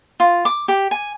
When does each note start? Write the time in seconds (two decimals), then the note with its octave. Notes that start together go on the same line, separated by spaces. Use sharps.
0.20 F4
0.45 D6
0.68 G4
0.91 G#5